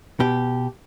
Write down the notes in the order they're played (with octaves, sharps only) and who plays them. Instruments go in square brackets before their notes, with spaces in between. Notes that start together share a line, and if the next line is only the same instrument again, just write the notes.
[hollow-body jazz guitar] B2 G4